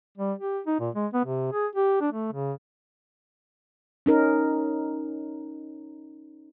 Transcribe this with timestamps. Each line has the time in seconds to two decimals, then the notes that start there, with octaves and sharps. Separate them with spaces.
0.18 G3
0.39 G4
0.66 D#4
0.80 A#2
0.95 G#3
1.14 B3
1.25 C3
1.53 G#4
1.76 G4
2.01 D4
2.12 A3
2.32 C#3
4.06 C#4 D#4 A#4